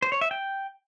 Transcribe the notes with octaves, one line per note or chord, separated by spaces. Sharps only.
C5
C#5
E5
G5